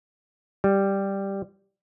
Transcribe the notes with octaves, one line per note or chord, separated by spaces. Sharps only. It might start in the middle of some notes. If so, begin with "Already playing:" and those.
G3